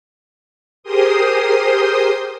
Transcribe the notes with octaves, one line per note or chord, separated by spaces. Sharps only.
G4 G#4 A#4 C5 C6 D#6